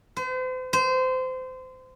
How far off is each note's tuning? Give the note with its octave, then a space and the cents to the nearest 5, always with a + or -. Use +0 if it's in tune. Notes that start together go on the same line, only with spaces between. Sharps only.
C5 -40
C5 -25